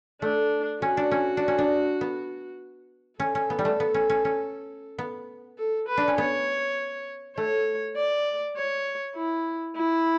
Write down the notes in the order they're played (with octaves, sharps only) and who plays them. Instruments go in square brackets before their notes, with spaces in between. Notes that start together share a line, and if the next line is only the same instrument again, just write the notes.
[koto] A3 [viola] D4
[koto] C#4 [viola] F#4
[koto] D4
C#4
D4
C#4
D4
B3
[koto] C#4 [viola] A4
[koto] C#4
B3
G3
A3
B3
C#4
C#4
C#4
B3
[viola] A4
B4
[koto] D4
C#4
[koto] B3 [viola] C#5
[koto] A3 [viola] C#5
[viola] D5
C#5
E4
E4